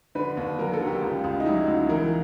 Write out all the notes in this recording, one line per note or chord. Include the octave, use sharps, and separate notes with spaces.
D3 B4
D#2
F#3 A#4
A4
D3
G4
C#2
C#2
D#4
F#3 E4
C#2
E3 A#4